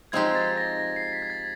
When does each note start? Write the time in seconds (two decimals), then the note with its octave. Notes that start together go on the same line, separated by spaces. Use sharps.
0.12 F3 G#3 C4 D#4 G4 G#6
0.35 A6
0.57 A#6
0.79 A#6
0.96 C7
1.13 B6
1.23 G#6
1.30 A6